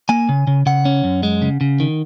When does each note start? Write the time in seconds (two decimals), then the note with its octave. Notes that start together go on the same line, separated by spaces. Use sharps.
0.09 A#3 G#5
0.29 C#3
0.47 C#3
0.66 C#3 F#5
0.85 C#4
1.04 F#2
1.23 G#3
1.42 C#3
1.61 C#3
1.80 D#3